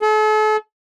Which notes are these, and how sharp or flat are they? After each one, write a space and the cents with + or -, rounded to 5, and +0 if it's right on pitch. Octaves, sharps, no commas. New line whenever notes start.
A4 -40